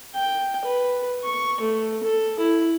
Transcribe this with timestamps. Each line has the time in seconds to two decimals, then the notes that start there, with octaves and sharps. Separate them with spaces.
0.15 G5
0.65 B4
1.24 C#6
1.61 A3
2.04 A4
2.39 E4